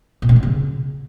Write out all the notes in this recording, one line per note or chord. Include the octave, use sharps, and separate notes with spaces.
A#2
C4
A#3
C#3